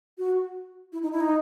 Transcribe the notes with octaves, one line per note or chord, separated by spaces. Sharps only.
F#4
E4
D#4
E4
D#4